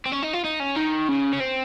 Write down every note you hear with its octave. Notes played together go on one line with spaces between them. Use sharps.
C4
C#4
D#4
F4
D#4
C#4
D#3
C#3
C#4
C4